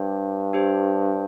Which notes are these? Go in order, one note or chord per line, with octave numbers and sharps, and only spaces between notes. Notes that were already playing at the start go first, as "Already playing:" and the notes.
Already playing: G2 D4 G4 C5
D4 G4 C5